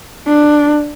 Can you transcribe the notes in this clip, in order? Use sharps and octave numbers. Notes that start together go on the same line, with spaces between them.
D4